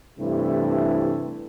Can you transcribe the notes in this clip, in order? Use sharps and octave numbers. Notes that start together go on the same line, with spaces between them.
G2 C3 E3 A3 E4